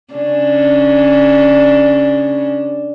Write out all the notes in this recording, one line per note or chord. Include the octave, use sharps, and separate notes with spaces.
C#3 C#4 D4